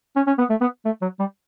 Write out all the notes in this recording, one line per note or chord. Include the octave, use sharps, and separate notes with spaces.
C#4
C#4
B3
A3
B3
A3
F#3
G3